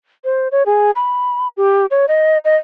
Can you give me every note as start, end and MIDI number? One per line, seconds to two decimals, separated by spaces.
0.24 0.48 72
0.52 0.63 73
0.66 0.91 68
0.96 1.48 83
1.57 1.86 67
1.91 2.06 73
2.08 2.38 75
2.45 2.56 75